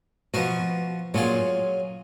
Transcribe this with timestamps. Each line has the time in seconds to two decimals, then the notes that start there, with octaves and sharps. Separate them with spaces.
0.34 B2 F3 B3 F#4 A#4
1.14 A#2 F#3 C#4 F4 G#4